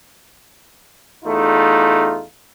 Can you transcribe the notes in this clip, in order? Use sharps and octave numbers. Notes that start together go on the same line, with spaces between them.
E2 A3 D#4 F4